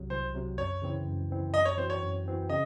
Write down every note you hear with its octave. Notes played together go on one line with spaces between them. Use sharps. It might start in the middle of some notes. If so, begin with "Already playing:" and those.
Already playing: C2 C3 F#3
C2 C5
C3 F#3
F#2 C#5
C#3 E3 C4 E4
F#2
C#3 E3 C4 E4
F#2 D#5
C#5
E3 C4 F#4 C5
C#5
F#2
E3 C4 F#4
C#3 D#5